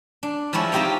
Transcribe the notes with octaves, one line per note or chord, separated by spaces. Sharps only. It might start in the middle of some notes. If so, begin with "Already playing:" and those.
D4
F3 G3 G#3 E4 C#5
C4 D#4 F4 G4 G5 A#5